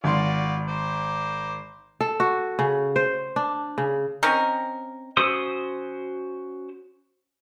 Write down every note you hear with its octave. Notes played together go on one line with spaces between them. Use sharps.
G#1 F4 F#4 D5 C6
C5 A#5 D6
A4
F#4
C#3
C5
D4
C#3
C4 C#4 D#4 A#4
C#4 F#4 C5 D#6 E6